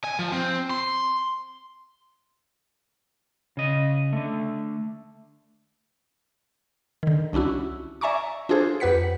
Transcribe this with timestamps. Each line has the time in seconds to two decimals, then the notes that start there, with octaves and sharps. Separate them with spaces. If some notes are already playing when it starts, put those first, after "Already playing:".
0.04 G#5
0.19 F3
0.32 C4
0.71 C6
3.57 C#3 D#5
4.13 D3 A3
7.03 D3 D#3
7.33 C2 C#4 D4 E4 F#4
8.01 D5 E5 G#5 A#5 C#6 D6
8.49 D4 F4 F#4 G#4 A4 C5
8.80 F2 G4 B4 F#5 B6 C#7